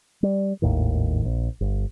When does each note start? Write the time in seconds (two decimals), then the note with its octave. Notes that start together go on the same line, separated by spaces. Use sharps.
0.23 G3
0.62 G#1 D#2 A2 D#3
1.25 A#1
1.61 G1